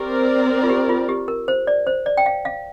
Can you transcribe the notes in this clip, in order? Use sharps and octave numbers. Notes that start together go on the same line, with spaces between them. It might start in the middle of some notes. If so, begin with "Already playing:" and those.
Already playing: C4 G4 A#4 D5
F4
G4
F4
G4
A#4
C5
D5
C5
D5
G5
F5
F5